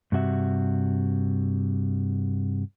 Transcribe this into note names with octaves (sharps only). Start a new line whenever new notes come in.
G2 C3 F#4 E5